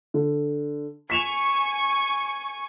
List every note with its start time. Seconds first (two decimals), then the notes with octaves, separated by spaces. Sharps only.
0.14 D3
1.10 G#5 C#6 B6 E7 F7